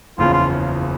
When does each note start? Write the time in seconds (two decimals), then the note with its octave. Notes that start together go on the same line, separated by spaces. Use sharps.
0.18 F#1 E2 C#3 F3 F4
0.33 F4